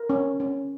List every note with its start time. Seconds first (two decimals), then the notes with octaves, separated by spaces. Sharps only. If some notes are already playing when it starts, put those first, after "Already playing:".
Already playing: A#4
0.10 C#4
0.40 C#4